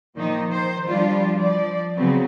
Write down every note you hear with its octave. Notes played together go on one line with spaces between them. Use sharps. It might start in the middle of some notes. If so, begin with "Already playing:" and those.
A#2 D#3 F3 A#3 D#4
D#3 C5
F3 G3 D4 F4
F3 D5
C#3 F#3 B3 C4